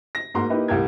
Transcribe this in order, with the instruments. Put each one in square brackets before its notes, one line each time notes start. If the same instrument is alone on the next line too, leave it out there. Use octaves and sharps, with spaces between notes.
[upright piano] A#6
G#2 A#3 F#4 A#5 C6
A#3 D#4 E4 G4 B4
C2 A2 G4 A#4 G#6